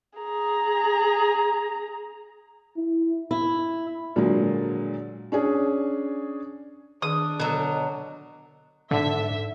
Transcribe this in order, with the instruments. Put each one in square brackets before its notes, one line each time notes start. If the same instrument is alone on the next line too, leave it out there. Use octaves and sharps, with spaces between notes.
[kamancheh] G#4 A#5
[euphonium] E4
[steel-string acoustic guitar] E4
[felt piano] A#2 D3 F3 F#3 G#3
C#4 D4 G#4
[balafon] D#3 G#4 [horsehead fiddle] D4 [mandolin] D#6
[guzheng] B2 F#3 [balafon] D3 A4
[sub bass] G#2 [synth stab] D3 [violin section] E5